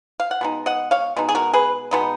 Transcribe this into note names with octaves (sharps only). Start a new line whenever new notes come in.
F5
F#5
B2 G#3 D#4
D#5 F#5
C#5 F5
B2 G#3 D#4
G#4
F#4 A#4
G#4 B4
B2 G#3 B3 D#4